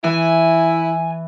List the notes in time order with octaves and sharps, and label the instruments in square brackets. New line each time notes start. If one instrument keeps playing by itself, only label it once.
[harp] E3 [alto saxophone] E4 [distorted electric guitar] G#5